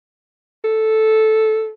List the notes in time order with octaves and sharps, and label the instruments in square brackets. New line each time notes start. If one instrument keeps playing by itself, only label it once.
[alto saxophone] A4